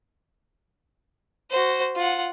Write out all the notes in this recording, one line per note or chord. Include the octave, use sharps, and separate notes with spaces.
F#4 C5
F4 F#5